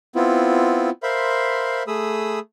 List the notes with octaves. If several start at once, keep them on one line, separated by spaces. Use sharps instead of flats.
B3 C4 E4 F4
A#4 C5 E5 F5 B5 C6
A3 G#4 B5 D#6 E6